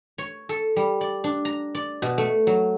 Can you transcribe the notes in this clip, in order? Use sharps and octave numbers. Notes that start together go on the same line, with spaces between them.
C#5
A4
G3
D5
D4
A#5
D5
B2
A3
F#3